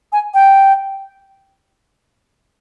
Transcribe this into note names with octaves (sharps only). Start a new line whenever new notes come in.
G#5
G5